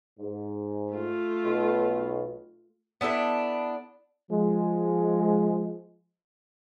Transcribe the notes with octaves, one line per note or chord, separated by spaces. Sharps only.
G#2
A3 F4
B1 B2
B3 D4 E4 A4
F3 G#3